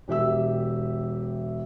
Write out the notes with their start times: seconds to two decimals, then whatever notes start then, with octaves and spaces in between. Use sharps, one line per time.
0.08 E1 G4 E5 E6